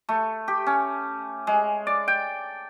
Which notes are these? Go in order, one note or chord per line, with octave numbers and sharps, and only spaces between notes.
A3
G4
C#4
G#3
D5
G5